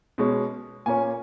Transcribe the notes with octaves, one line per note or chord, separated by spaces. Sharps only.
B2 G#3 C#4
A#2 A#3 C#4 G#5